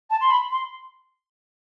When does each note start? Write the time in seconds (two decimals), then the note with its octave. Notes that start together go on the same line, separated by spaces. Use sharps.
0.10 A5
0.21 C6
0.31 B5
0.51 C6